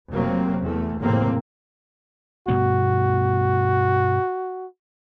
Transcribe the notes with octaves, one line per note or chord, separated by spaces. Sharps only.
F1 C3 F#3 A#3 C4
E2 A3
F#1 E2 A2 C3 A#3 C4
G2 B2 B3 F#4